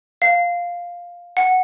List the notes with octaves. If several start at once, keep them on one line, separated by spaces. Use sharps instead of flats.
F5
F#5